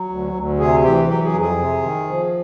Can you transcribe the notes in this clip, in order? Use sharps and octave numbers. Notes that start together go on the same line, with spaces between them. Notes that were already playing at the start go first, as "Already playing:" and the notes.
Already playing: F#3
D2
D2
C3 G#4
E3 G4
F#3 G4
G#4
F2
G#4
C3
D#3
F3